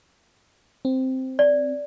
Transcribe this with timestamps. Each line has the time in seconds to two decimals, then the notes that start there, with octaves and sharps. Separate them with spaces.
0.85 C4
1.39 D5